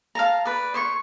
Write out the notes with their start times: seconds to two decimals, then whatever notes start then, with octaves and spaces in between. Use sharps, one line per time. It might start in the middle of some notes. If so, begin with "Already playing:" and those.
0.15 F5 A5 A#5
0.45 B4 D5
0.74 C5 C#5 C#6